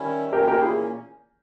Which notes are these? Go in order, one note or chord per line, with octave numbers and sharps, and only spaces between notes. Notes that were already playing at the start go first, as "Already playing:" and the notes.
Already playing: D#3 G3 C#4 E4
A#2 A#3 C#4 G4 A#4
G4 A#4
E4 G#4